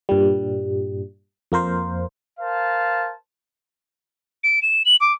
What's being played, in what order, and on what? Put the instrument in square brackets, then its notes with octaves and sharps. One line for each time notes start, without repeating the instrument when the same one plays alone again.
[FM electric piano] G2 A#2 G3
F2 A#3 A#4 C5
[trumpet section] A#4 C5 F5 A5
[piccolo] D7
E7
F#7
D6